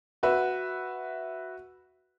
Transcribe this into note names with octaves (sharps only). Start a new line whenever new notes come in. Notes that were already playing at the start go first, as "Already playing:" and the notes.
F#4 B4 E5